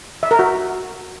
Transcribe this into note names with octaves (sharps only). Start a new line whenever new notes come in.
E5
A#4
F#4